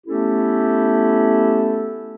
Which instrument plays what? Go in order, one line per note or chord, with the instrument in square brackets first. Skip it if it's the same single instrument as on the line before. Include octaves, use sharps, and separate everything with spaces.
[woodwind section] A3 B3 C#4 E4 G4 A4